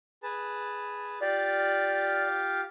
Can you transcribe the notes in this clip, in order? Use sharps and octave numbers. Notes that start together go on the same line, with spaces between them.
G#4 B4 A5
F4 G4 D5 F5